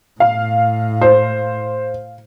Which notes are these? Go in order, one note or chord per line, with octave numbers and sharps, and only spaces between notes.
A2 F5
C5